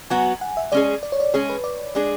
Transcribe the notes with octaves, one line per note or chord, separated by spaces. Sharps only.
F#3 B3 F#4 G#5
F#5
E5
G#3 C#4 G#4 D5
D5
C#5
D5
G#3 C#4 G#4 C#5
B4
D5
G#3 D4 G#4 D5